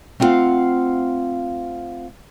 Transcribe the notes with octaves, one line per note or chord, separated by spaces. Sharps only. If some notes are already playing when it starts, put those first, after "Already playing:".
A3 C4 E4 F4 F5 F#5